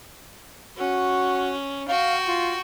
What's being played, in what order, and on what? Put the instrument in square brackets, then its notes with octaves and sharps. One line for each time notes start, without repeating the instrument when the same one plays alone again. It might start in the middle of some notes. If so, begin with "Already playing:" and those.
[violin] C#4 [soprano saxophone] F#4
[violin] F#4 G5 [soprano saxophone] F5
[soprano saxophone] F4